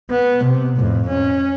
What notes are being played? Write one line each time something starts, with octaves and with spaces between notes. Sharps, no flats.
B3
C3
F2 A2
C#4